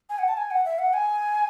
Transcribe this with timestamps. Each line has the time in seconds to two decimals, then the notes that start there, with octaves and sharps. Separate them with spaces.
0.09 G#5
0.19 F#5
0.28 A5
0.37 G#5
0.51 F#5
0.65 E5
0.79 F#5
0.93 G#5